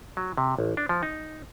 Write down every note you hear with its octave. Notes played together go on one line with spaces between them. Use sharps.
F#3
C3
A1
D4
F3
D#4